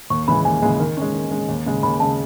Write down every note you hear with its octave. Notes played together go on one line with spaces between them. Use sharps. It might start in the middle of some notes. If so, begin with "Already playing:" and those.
D#2 C#6
C#3 E3 G#3 B5
D#2 G#5
C#3 E3 G#3
D#3
G#3 C#4
D#3
G#3 C#4
D#2
C#3 G#3
D#2 B5
C#3 G#3 A5